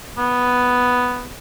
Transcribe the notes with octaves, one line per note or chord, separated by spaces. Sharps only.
B3